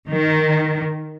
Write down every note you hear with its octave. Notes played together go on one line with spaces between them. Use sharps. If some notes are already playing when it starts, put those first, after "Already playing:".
D#3